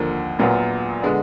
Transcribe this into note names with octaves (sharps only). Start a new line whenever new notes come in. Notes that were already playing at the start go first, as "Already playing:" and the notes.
Already playing: D#2 D3 F3 A#3
A#1 A#2 F#3 B3 F4
D3 G#3 B3 D4